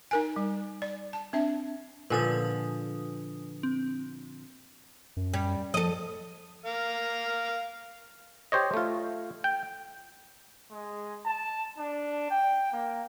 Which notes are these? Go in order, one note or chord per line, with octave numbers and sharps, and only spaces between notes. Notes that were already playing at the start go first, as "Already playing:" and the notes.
D#4 A#4 G#5
G3
D5
A5
C4 D4 E5
A#2 D3 F3 B4 G#5 D#6
C4
F#2
G3
F3 A4 D#5
A#4 F5
G4 C5 C#5 D#5
A3 F4
G5
G#3
A5
D4
G5
A#3